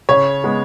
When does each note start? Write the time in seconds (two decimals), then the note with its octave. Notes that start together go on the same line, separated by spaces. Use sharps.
0.09 C#3 C#5
0.44 G#3 B3